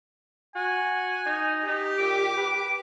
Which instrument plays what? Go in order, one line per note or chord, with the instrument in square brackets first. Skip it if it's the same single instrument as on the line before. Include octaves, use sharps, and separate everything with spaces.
[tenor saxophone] F#4 [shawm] G#5
[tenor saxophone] D#4
[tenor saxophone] D#4 [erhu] G4
[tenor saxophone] A#2 [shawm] D6
[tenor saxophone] B4